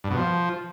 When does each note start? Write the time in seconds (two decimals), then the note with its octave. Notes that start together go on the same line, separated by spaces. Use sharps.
0.04 G2
0.11 B2
0.17 F3